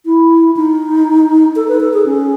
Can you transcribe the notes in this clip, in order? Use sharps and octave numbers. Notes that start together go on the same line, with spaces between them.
E4
D#4
A4
B4
A4
G#4
C#4